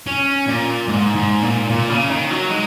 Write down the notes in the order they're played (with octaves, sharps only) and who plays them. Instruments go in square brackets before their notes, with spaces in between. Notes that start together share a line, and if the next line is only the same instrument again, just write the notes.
[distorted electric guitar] C#4
A#2
G#2
G#2
A#2
A#2
C#3
D#3
F#3
G#3